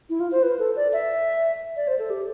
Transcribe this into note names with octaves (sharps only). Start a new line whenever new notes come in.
E4
F4
C5
B4
A4
D5
E5
D5
C5
A4
G4